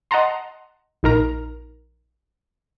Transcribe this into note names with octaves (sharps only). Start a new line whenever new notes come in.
D#5 F#5 A5 A#5 C6
A#1 D#4 A#4 A#5